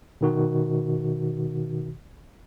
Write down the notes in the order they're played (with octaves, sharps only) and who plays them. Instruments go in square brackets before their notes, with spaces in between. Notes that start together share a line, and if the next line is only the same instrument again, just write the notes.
[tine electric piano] B2 D#3 F#4